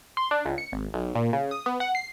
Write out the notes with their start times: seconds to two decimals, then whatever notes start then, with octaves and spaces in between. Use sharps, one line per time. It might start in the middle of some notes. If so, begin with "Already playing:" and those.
0.17 C6
0.31 D4
0.45 C#2
0.58 C#7
0.72 G#1
0.94 B1
1.15 A#2
1.33 C#3
1.51 D#6
1.66 B3
1.80 F#5
1.95 C7